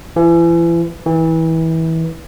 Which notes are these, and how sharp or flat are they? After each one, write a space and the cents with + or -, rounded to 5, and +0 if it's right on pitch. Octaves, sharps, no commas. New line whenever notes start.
E3 +35
E3 -25